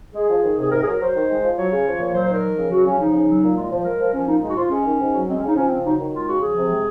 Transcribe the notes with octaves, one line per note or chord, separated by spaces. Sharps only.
G#3 G#4
F3
D#3
C3 G#4
G#2 A#4
G#4
F#3 A#4
F#3 C5
D#3
G#3
F3
F#3 C#5
C#3
F3
A#2
F#3 C5
C5
D#3 A#4
F3
C#3
F#3 F#4
C#3 C#4
F3 D#4
C#3
F#3
A#2
G#3 F4
F3
G#3 A#4
F3
F3 C#4
A#2 D#4
G#3 D#4
F#4
F3 F4
G#3 C#4
D#3
G#2
F#3
G#3 C4
C#4
C#3 D#4
F3 C#4
C4
C#3
F#3 D#4
D#3 D#4
G#3 F4
C#3 F#4
F3 G#4
C3
G#3